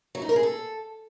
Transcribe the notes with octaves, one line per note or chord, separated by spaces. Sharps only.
F#3
D#4
A#4
G#4
A4